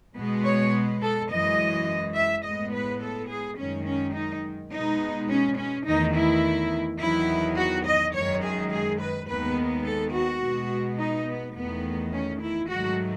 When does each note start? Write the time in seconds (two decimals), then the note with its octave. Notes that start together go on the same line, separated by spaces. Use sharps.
0.17 B2 G#3 B3
0.45 C#5
1.02 A4
1.30 F#2 E3 G#3 D#5
2.15 E5
2.44 A2 G#3 B3 D#5
2.73 B4
3.01 A4
3.29 G#4
3.57 F#2 D#3 G#3 C#4
3.86 C#4
4.15 D#4
4.71 B2 G#3 B3 D#4
5.29 C#4
5.57 C#4
5.85 E2 D#3 A3 D#4
6.15 E4
6.99 E2 D#3 F#3 B3 E4
7.57 F#4
7.85 D#5
8.13 F#2 D#3 G#3 C#5
8.42 G#4
8.71 G#4
8.99 B4
9.27 D#2 D#3 G#3 B3 B4
9.84 A4
10.12 F#4
10.41 B2 G#3 B3
10.98 D#4
11.27 B3
11.55 E2 D#3 A3 B3
12.12 C#4
12.40 E4
12.69 G#2 D#3 F#3 A3 F#4